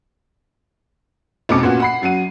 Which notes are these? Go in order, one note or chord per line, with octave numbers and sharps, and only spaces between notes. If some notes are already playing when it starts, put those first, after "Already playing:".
F1 F2 B2 C#4 D6 C#7
A#2 A#3 B3 C#4 F#4
F#5 B5 C7
F#2 F#3 F#5 D#7